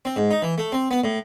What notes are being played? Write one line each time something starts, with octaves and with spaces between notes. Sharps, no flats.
C4
G#2
D#4
E3
A3
C4
B3
A2